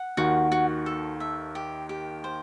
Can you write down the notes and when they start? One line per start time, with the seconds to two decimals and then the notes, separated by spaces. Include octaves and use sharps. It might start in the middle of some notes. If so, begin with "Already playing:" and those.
Already playing: F#5
0.17 D#2 D#3 F#4
0.52 F#4
0.86 A4
1.20 E5
1.55 G4
1.89 G4
2.24 C5